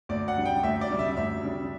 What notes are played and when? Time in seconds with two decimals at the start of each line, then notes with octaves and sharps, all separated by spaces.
0.09 D2 D5
0.28 F#5
0.36 C#3 G3 D4
0.46 G5
0.63 D2 E5
0.81 D5
0.90 C#3 G3 D4
0.99 E5
1.17 D2 E5
1.43 C#3 G3 D4